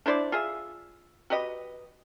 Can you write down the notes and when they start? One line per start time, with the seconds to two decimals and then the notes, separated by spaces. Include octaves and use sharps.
0.06 D4 E4 C5 D5
0.32 F4 G#4 E5
1.30 F#4 G4 B4 D#5